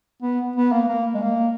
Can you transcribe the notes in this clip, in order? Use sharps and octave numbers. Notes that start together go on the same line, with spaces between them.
B3
B3
A#3
A#3
G#3
A#3